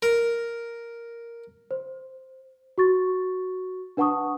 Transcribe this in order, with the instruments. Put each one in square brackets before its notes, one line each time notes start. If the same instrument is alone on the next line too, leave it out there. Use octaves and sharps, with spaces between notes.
[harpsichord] A#4
[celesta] C5
F#4 C#6 A6
D4 B4 F#5 A5 C#6 D#6